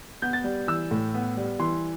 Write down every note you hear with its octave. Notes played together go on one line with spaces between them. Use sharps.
B3 G6
A6
G3
E3 E6
A2
B3
G3
E3 C6